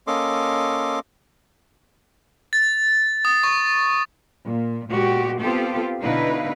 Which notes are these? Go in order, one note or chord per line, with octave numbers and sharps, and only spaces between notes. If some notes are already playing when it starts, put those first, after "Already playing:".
A#3 C#4 A4 D#5 C6 D6
A6
D#6
C#6
A#2
A#2 G#3 B3 F#4 G4
B3 C4 F4 G4 A4
B2 D3 D#4 E4 B4 F5